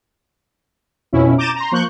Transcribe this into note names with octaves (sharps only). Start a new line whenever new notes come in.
F2 B2 F3 C#4 E4
A#5 D6 G6 A6 D#7 E7
A#5 C6
F3 A#3 C#6 F#6 G6